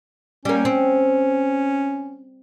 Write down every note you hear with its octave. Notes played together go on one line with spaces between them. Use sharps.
G3 A#3 C#4
C4